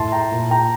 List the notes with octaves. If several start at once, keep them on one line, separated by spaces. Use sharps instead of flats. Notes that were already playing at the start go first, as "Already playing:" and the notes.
Already playing: A2 A5 C6
G5 A#5
A#2
G5 A#5